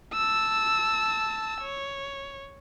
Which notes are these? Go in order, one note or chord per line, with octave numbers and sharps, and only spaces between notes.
A5 E6
C#5